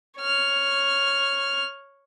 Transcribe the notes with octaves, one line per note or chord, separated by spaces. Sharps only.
C#5 F6